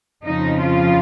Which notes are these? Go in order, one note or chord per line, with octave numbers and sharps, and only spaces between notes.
F2 C#3 F3 D#4
F4